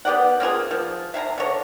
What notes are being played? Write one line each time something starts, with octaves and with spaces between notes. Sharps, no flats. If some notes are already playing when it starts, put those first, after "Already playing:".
B3 G4 D5 F#5
A#3 C4 F4 G#4
F3
E5 F5 G#5 A#5
D3 C#5